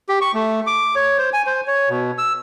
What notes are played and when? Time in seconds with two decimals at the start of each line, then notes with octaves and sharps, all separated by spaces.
0.09 G4
0.21 C#6
0.34 A3
0.67 D6
0.95 C#5
1.18 C5
1.33 G#5
1.46 C5
1.68 C#5
1.89 B2
2.18 E6